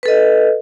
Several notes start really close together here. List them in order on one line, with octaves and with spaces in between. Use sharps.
B4 A4 D#5